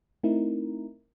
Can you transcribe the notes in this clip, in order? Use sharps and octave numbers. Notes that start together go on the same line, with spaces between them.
A3 C4 D#4 E4 A#4